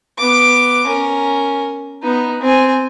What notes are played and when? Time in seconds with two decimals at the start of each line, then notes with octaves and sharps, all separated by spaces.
0.19 B3 D6
0.87 C#4 A#4
2.03 B3 D#4
2.41 C4 G#5